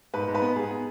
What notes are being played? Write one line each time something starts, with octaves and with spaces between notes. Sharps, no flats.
G#2 B4
G#2
B4
B3
G#2 G#4
B3